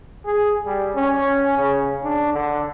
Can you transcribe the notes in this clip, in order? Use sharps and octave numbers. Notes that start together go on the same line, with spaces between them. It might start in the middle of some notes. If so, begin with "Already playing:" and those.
G#4
G3
C#4
C#3
D4
D3